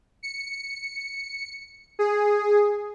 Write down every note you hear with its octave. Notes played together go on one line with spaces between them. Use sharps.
C#7
G#4